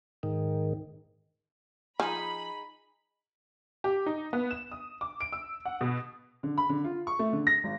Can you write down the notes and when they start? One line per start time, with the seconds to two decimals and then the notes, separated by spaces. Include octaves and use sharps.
0.23 G#2 D#3
2.00 F3 D#4 G#4 G#5 B5
3.84 G4
4.06 D#4
4.33 B3
4.51 E7
4.71 D#6
5.01 D6
5.21 D7
5.33 E6
5.65 F#5
5.81 B2
6.43 D3
6.58 B5
6.69 D3
6.84 F4
7.07 C#6
7.19 A3
7.33 D3
7.47 A#6
7.64 G#1